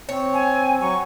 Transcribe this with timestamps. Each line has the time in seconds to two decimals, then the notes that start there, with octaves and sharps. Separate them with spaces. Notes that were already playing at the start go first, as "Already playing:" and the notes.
0.09 C4 C#5
0.34 G#5
0.81 F#3 C#6